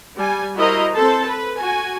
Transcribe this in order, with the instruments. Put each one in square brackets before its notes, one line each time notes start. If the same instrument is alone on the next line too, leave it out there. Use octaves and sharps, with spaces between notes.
[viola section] G3 G#5
E4 F#4 A#4 C5 D#5 A#5
C4 A4 C5 A5
B4
F#4 G#5